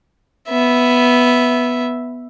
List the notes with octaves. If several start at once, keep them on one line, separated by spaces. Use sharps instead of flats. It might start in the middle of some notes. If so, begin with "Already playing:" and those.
B3 E5